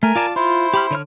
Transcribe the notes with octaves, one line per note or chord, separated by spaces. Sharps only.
A3 A#4 G#5 F6
F4 D5 A5
E4 F4 C5
G4 B5 F6
D3 C#5 F6